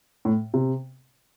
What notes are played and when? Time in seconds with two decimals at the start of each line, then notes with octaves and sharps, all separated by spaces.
0.25 A2
0.54 C3